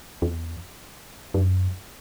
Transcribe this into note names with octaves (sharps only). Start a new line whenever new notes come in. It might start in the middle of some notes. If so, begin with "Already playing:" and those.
E2
F#2